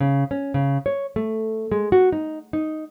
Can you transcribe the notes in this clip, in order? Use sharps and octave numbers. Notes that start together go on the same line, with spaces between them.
C#3
C#4
C#3
C#5
A3
G#3
F#4
D#4
D#4